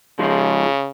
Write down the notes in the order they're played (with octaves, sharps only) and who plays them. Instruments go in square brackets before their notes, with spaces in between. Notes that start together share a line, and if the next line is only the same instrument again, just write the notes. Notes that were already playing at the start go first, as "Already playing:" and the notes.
[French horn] C#3 [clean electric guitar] F3 G#3